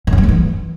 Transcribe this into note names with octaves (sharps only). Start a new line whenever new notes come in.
A2
F#2
G3
G2
E3